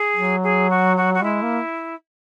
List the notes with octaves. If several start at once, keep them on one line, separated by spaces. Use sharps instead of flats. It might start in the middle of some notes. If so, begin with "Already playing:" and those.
Already playing: G#4
F#3
G#4
F#4
F#4
F#4
G#3 E4
A#3